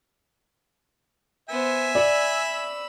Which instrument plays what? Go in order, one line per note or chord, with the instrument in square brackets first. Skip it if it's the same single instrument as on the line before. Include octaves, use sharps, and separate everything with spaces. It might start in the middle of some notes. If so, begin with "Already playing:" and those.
[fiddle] B3 C5 [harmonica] E5 G#5
[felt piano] D5 [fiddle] B5 E6